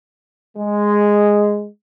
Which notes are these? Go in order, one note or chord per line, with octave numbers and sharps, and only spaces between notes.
G#3